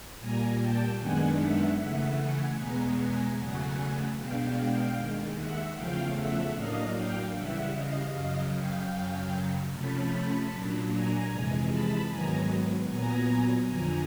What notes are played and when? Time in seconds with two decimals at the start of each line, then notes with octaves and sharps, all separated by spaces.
0.19 A#2 G3 A#3 G#5 A#5
0.58 G5 A5
0.98 F#2 D#3 G#3 B3 D4 F#5 G#5
1.38 E5 F#5
1.78 C#3 E3 A3 E5 F#5
2.18 F#5 G#5
2.57 E2 B2 G#3 B3 G#5 A#5
2.97 G#5 A#5
3.36 E2 C#3 F#3 A3 F#5 G#5
4.16 B2 G#3 B3 D4 F5 G5
4.95 D#2 D#3 G#3
5.34 E5 F#5
5.74 E2 C#3 F3 A3 F5 G5
6.14 E5 F#5
6.53 A2 F#3 A#3 D4 D#5 F5
6.93 F5 G5
7.33 C#3 E3 G3 E5 F#5
7.73 D#5 F5
8.12 F#2 C#3 F#3 D#5 F5
8.52 F5 G5
8.91 F#2 C#3 F#3
9.71 C3 F3 A3 C#4 A5 B5
10.50 A#2 F#3 A#3 D4
10.90 G#5 A#5
11.30 F2 C3 E3 G#3
11.69 A5 B5
12.08 G#2 D#3 F#3 B3 G#5 A#5
12.88 A#2 F#3 B3 G#5 A#5
13.67 F2 D3 F3 G#5 A#5